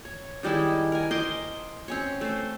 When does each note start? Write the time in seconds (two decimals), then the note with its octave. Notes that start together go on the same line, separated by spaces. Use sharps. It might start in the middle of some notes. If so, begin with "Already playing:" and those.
0.05 C#5
0.43 D#3 G3 G#3 E4
0.92 A#4 G#5
1.11 C5 D#5 C6 D6
1.88 C4 C#4 C#5
2.21 A3 C5